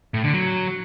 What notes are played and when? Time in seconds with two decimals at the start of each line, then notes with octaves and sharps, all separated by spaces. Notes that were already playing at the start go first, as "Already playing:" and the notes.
0.14 A2
0.24 D3
0.34 F#3